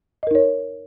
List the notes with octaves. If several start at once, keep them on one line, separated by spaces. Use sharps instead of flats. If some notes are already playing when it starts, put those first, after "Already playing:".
D#4 A#4 C#5 D#5